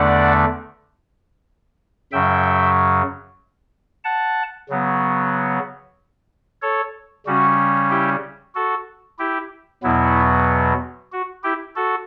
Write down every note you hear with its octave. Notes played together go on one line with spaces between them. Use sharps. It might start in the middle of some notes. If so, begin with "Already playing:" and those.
Already playing: E2 D3 A3 D4 D5 F#5
F#2 C#3 F#3 E5 G5
F#5 A5
C#3 F#3 B3
A4 C#5
C#3 G3 C#4 F#4
E4 G4
F#4 A4
E4 G4
E2 B2 F#3 B3 E4
F#4
E4 G4
F#4 A4